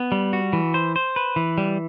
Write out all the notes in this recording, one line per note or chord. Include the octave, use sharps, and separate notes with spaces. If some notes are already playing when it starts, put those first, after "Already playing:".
Already playing: B3
G3
F#4
E3
C5
C5
B4
E3
G3